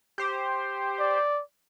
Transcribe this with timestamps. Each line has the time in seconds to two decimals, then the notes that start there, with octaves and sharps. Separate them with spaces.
0.18 G4 C5
0.99 D5